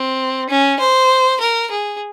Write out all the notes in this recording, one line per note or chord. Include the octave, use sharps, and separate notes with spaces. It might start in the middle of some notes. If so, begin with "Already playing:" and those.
Already playing: C4
C#4
C5
A#4
G#4